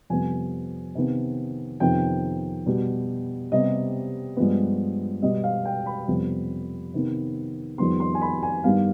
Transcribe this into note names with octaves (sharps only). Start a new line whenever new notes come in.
F2 C3 G3 B3 G#5
C3 D#3 B3
F2 C3 D#3 B3 G5
B2 G3 B3
C3 G3 B3 D#5
G2 F3 G#3 B3
B2 G3 B3 D#5
F5
G5
B5
F2 C3 G3 B3
C3 D#3 B3
F2 D#3 G3 B3 C6
C6
G#5
B5
G#5
G2 D#3 G3 B3 F5